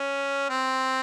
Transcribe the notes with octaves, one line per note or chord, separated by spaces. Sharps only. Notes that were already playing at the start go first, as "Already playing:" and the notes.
Already playing: C#4
C4